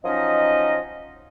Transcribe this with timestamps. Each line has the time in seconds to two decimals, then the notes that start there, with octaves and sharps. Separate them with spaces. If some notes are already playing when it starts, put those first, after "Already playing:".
0.05 F3 F#3 C#4 D#4 D#5